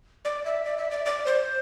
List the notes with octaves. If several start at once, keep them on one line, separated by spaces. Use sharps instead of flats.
D5
E5
D5
E5
D5
D5
C5